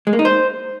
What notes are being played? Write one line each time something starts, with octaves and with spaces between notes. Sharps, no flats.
G#3
A#3
D#4
C5